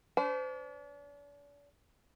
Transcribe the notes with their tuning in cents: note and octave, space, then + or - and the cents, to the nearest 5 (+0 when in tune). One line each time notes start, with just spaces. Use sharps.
D4 -40 C5 -35